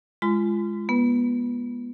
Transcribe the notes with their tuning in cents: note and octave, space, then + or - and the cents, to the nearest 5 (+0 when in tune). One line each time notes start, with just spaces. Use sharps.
G#3 +0 F4 -25 C6 -35
B3 -30 B4 +0